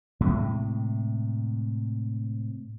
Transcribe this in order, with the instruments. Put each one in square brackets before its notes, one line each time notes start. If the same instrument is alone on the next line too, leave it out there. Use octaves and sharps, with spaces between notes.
[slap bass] A2 C3 G#3